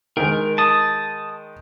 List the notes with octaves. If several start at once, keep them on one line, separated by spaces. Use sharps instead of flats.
D#3 G#3 A#4
A5 D#6